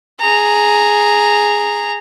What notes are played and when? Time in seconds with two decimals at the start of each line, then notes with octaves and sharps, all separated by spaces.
0.20 G#4 A#5